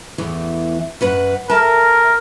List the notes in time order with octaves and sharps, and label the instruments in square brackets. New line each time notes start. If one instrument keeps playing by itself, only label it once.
[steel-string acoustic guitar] E2 A2 E3
F#2 B4 F#5
[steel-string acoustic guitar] A4 E5 A5 [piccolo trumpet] A#4